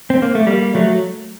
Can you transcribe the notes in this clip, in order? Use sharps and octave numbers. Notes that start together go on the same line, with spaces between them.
C4
A#3
A3
G3 A#3
F#3 A3